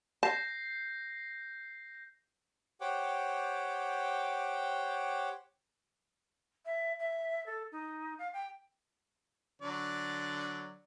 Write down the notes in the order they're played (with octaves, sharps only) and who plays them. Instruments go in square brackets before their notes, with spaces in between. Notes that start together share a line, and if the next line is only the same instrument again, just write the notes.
[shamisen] A5 [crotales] G6 A#6 C7
[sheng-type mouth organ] G4 C5 C#5 F#5 G5 D6
[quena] E5
E5
A4
D#4
F5
G5
[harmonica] D3 F#3 D5